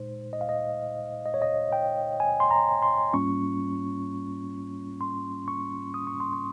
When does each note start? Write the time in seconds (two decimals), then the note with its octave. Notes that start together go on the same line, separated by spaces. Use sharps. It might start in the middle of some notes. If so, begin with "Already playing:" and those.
Already playing: A#2 G#3 D#4 C5
0.33 D#5
0.41 F5
0.49 D#5
1.26 D#5
1.34 C#5
1.42 D#5
1.73 G5
2.20 G#5
2.40 C6
2.51 A#5
2.83 C6
3.13 G#2 G3 A#3 C#4 F4 C#6
5.01 C6
5.48 C#6
5.94 D#6
6.07 C#6
6.20 C6
6.33 C#6